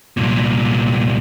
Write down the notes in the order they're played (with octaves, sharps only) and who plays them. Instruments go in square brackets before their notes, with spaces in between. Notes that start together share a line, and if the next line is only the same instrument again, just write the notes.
[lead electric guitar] C2 A#2